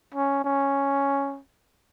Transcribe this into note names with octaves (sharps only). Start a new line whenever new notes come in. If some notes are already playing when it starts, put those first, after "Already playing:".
C#4
C#4